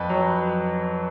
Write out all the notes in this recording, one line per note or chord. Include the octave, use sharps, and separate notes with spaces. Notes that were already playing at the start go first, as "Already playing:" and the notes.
Already playing: F2 B4
F#3